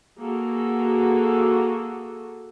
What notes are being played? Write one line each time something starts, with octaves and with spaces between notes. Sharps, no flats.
A#3 F#4 G#4 A4